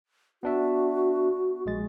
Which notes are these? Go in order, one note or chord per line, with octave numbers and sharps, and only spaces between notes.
B3 D4 F#4 E5
A#1 G#3 A6